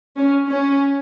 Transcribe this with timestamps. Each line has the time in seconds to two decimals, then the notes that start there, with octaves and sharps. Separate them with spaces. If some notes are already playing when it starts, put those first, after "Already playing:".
0.17 C#4
0.48 C#4